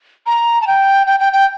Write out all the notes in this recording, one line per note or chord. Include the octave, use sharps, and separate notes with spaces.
A#5
A5
G5
G5
G5
G5